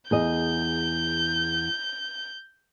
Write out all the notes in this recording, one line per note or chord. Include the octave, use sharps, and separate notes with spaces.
E2 G#4 D#5 G6